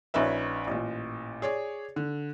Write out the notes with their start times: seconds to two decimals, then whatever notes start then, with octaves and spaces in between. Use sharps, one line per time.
0.14 A#1 C#4 D#4 B4 E5
0.67 A1 A#2
1.42 G#4 C#5 D5
1.96 D3